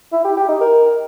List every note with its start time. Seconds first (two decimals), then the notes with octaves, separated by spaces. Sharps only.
0.13 E4
0.25 G4
0.37 G4
0.49 D#4
0.61 A#4